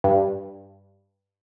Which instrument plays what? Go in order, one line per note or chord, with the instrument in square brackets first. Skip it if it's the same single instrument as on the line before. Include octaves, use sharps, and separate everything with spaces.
[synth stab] G2